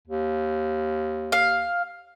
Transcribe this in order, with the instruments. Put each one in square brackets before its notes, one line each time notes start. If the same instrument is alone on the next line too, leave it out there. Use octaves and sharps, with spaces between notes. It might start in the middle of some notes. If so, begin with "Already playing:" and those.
[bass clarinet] D#2
[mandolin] F5